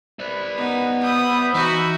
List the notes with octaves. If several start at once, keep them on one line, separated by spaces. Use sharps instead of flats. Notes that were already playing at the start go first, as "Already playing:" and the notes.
B4 C5 D5
B3 D#4
E5 B5 D#6 G6
E3 D#4 F#4 D#6